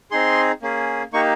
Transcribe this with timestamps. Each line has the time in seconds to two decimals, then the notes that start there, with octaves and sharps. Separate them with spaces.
0.11 C4 D#4 G#4 C6
0.62 A#3 C#4 G#4
1.13 A#3 D#4 G4 C#6